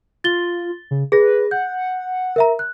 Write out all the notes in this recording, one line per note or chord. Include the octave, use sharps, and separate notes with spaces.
F4 A6 G7
C#3
G#4 B4 A#6
F#5 G6
A#4 E5 A#5
F#6